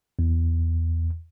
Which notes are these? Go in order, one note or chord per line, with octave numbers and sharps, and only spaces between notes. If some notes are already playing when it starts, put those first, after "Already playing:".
E2